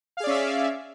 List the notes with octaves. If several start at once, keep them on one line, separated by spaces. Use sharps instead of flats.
C#4 G#4 D5 E5 F5